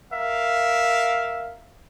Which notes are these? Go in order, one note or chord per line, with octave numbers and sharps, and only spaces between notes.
A#4 E5 F5